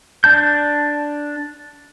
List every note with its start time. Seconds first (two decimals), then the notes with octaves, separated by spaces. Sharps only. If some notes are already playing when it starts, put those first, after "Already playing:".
0.24 D4 A5 G6